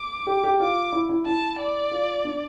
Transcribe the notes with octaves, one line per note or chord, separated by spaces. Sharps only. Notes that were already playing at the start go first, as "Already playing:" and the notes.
Already playing: D6
G4
G4
F4 D6
E4
E4
E4 A5
D5
F4
D4